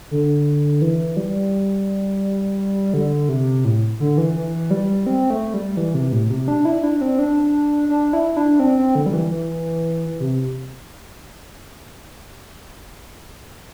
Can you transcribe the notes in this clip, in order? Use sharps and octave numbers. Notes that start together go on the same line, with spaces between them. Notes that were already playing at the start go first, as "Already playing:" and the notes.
D3
E3
G3
D3
C3
A2
D3
E3
E3
G3
C4
A3
G3
E3
C3
A2
C3
D4
E4
D4
C4
D4
D4
E4
D4
C4
C4
D3
G3
E3
E3
C3